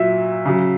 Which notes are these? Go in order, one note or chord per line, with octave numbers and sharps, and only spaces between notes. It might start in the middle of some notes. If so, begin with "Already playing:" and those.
Already playing: A#2 F#3 E5
C#3 F#3